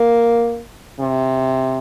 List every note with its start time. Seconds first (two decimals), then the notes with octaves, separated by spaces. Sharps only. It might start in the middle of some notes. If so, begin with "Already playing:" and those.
Already playing: A#3
1.00 C3